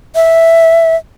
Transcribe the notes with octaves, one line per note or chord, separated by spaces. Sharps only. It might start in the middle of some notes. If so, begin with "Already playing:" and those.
E5